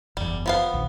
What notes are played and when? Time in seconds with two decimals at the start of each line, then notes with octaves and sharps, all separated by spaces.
0.17 F#1 E2 G3
0.46 F3 B3 F5
0.74 A#1 D#2